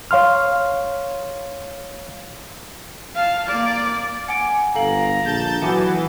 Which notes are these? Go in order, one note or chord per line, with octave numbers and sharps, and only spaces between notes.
C#5 F5 C6 F6
F5 A5
A#3 D5
F#5 G#5 D6 D7
G1 A4 F5 A#5 F#7
A#1 A5 G6 A6
E3 F#3 B3 F#5 G#5 D6